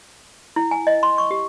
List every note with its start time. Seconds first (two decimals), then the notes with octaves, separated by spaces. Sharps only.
0.56 E4
0.71 G#5
0.87 D#5
1.03 C6
1.18 C#6
1.31 G4